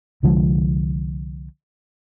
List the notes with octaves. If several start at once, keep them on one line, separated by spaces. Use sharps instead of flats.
C2 D3 F3 G#3